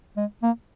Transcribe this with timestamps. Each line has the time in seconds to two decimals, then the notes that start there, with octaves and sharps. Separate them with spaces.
0.17 G#3
0.43 A#3